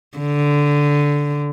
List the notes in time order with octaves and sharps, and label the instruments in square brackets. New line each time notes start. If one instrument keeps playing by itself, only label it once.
[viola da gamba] D3